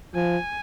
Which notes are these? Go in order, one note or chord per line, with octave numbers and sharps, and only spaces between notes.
F3 G#5